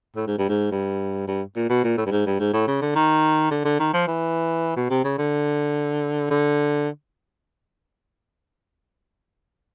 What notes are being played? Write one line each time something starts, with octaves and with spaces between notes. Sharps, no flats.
A2
G#2
G2
G#2
G2
G2
A#2
B2
A#2
A2
G2
G#2
G2
G#2
A2
C#3
D3
D#3
D3
D3
D#3
F3
E3
B2
C3
C#3
D3
D3